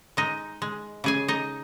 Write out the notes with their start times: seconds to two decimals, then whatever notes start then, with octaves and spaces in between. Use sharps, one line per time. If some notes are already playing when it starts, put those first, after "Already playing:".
0.17 G#3 D#4 D#5
0.62 G#3
1.04 C#3 G#4 G#5
1.28 D#4 D#5